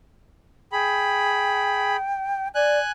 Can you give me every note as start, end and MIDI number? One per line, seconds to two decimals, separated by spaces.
0.72 1.97 68
0.72 2.48 79
0.72 1.97 83
2.55 2.79 74
2.55 2.92 80
2.55 2.92 90